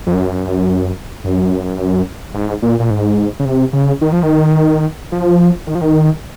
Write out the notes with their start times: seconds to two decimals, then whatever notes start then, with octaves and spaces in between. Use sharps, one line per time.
0.06 F2
0.14 F#2
1.24 F#2
2.34 G#2
2.62 A#2
2.80 A#2
2.90 G#2
3.39 C#3
3.45 C3
3.73 C#3
4.01 D#3
4.12 F3
4.23 D#3
5.12 F3
5.67 D#3
5.75 F3
5.81 D#3